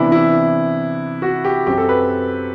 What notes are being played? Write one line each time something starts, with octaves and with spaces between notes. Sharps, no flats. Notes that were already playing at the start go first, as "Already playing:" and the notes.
Already playing: C3 E3 B3 D4 E4
E4
F#4
G4
F#2 F#3 C4 G4
A4
B4